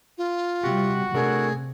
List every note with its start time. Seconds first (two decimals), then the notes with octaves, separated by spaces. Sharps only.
0.18 F4
0.63 C3 G3 F#4 G4 F#5
1.15 C3 A3 D4 G#4 A#4